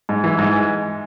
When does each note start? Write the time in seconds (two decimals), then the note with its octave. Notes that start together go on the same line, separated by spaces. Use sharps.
0.09 G#2
0.24 E3
0.38 G#2